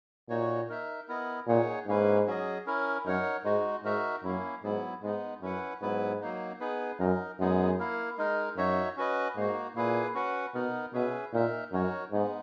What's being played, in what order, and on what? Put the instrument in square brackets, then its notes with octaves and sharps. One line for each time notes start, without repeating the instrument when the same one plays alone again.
[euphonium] A#2 [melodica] D#4 F#4 C#5
[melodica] D#4 A#4 E5
B3 E4 A#4 D#5
[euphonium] A#2 [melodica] D#4 G#4 C#5 F#5
[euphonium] G#2 [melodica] A#3 C#4 E4 B4
[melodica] F#3 C#4 G#4 D#5
C#4 E4 A#4
[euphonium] F#2 [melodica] D#4 A#4 C#5 F#5
[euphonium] G#2 [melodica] G#3 D#4 F#4
[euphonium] G#2 [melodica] D#4 F#4 A#4 E5
[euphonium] F#2 [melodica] A#3 C#4 E4
[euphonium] G#2 [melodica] F#3 B3 E4
[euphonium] G#2 [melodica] G#3 B3 D#4
[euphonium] F#2 [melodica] C#4 E4 B4 F#5
[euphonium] G#2 [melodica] F#3 B3 E4 B4
[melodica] F#3 A#3 D#4
B3 D#4 G#4 B4
[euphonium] F#2 [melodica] D#4 A#4 D#5
[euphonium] F#2 [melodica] G#3 B3 D#4 G#4
[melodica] A#3 E4 A#4
G#3 D#4 A#4
[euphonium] F#2 [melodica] D#4 F#4 C#5 E5
[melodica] C#4 F#4 B4 D#5
[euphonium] G#2 [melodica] A#3 D#4 F#4
[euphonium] A#2 [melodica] A#3 E4 G#4 B4
[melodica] C#4 F#4 B4 F#5
[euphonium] B2 [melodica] B3 D#4 A#4
[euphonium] B2 [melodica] C#4 G#4 B4 E5
[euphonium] A#2 [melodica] D#4 A#4 E5
[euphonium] F#2 [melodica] D#4 F#4 A#4 C#5
[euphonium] G#2 [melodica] G#3 B3 D#4